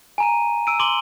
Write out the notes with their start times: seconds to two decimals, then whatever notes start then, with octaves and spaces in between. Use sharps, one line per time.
0.18 G#5 A#5 D#7
0.67 E6 D7 D#7
0.79 C6 D6 D7 F#7 G7